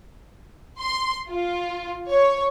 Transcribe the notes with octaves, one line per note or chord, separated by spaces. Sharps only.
C6
F4
C#5